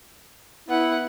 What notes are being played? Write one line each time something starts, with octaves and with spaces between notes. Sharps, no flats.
B3 E4 F#5